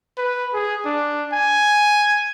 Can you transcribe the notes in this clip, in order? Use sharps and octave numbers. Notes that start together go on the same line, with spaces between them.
B4
G#4
D4
G#5